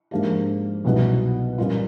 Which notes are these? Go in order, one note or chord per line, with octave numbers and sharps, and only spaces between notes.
G#2 F3 A#3 D4 G4
C2 B2 F#3 B3 D#4
A#2 G3 A#3 C#4 F4